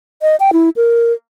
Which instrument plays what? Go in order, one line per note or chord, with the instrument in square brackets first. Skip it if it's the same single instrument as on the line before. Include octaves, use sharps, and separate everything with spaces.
[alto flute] D#5
G5
E4
A#4